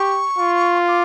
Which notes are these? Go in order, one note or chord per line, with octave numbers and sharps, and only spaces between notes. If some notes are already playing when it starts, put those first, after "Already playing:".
Already playing: G4 C#6
F4
D6